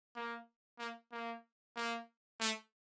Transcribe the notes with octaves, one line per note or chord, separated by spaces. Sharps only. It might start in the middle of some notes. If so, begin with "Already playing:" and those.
A#3
A#3
A#3
A#3
A3